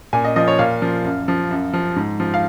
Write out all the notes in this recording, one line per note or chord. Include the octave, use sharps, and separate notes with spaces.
A#2 G#5
D#5
F3 D#5
C#5
A#2 F5
F3
F#2
F3
F#2
F3
G#2
F3
F5